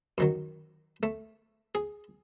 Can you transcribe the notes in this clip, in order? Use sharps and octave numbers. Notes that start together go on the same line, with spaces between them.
F#2 D#3 F#3
A3
G#4